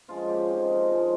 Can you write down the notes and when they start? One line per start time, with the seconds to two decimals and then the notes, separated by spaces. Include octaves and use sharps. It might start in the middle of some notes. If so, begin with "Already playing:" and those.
0.08 F3 G#3 C#4 F4
0.29 G4
0.49 F3 C4 D#4 G#4
0.70 A#4
0.91 F3 G#3 C#4